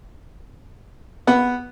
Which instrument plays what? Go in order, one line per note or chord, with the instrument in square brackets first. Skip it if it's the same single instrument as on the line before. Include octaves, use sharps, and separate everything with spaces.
[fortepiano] B3